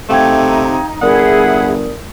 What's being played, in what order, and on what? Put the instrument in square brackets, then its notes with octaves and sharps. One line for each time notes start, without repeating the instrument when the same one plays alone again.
[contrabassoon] C3 [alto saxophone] A3 [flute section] D#4 [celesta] F5 G5 G#6
[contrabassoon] G1 [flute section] E4 G#4 [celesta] A#4 D5 D#6 [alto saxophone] F#5